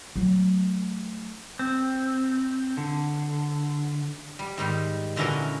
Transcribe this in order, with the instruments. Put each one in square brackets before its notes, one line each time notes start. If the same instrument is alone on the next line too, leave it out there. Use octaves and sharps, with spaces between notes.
[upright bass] F#3 A3
[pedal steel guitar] C4
D3
[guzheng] G3
G#2 D#3 G3
A#2 D3 E3 C#4 F#4 A#4